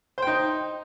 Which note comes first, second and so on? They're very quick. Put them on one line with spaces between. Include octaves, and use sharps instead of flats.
C5 G5 D#4